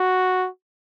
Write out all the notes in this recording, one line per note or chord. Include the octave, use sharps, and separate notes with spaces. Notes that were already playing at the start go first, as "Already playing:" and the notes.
Already playing: F#4